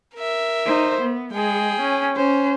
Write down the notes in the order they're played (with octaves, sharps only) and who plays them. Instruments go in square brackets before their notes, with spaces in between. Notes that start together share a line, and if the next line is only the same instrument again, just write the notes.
[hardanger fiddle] A#4 E5
[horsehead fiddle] D#4 C5
B3
[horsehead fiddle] G#3 [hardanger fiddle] G#4 G5
[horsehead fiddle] C#4
[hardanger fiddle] C#4 [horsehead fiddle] C5